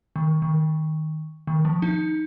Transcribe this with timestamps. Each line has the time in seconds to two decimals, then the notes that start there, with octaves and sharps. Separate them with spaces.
0.16 D#3
0.42 D#3
1.47 D#3
1.65 F3
1.82 D#4